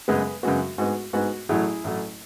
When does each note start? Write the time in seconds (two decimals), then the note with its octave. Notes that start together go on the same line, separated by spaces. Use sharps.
0.08 F#2 C#3 G#3 B3 G#4 B4
0.43 F#2 C#3 G#3 B3 F#4
0.78 G#2 G#3 B3 F#4
1.13 G#2 G#3 B3 F#4
1.49 A1 A2 F#3 A3 E4 G#4
1.84 A1 A2 F#3 A3